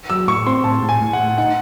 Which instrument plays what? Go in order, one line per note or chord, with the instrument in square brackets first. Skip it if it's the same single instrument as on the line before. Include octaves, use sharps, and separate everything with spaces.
[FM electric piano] F#3 [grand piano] E6
[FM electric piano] A2 [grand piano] C#6
[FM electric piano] C4 [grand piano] C6
[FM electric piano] A2 [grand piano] A5
[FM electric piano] A2
[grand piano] G#5
[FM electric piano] A2
[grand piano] F#5
[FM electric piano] A2
[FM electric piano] D#4 [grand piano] F#5